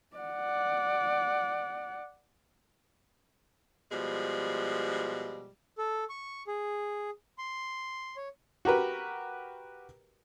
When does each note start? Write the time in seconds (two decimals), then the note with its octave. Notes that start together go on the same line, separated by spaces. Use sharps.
0.16 D5 F#5
3.92 B2 F3 G3 G#3
5.78 A4
6.09 C#6
6.47 G#4
7.38 C6
8.16 C#5
8.65 F#4 G4 A#4 B4